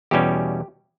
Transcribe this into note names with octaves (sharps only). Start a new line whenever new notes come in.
E2 B2 G3 C#4 G4